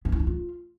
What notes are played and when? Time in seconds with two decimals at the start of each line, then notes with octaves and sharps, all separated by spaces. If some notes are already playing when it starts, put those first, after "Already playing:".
0.05 B3
0.12 E4
0.20 D#4
0.27 F4